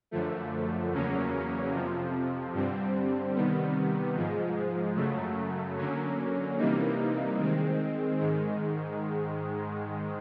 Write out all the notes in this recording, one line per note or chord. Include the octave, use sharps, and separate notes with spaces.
F#2 D3 F3 A3
E2 C#3 F#3 A#3 C#4
F2 C3 F3
G2 D3 G3 C4
C3 D#3 G3 B3
G#2 F3 G#3
F#2 C#3 F#3 A3
D3 F#3 A#3 C#4
C3 E3 G3 A#3 D#4
D#3 G#3 C4
G#2 D#3 G#3